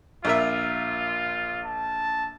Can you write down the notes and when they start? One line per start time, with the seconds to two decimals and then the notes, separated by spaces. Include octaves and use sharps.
0.25 A#1 F4 A#4 E5
1.65 A5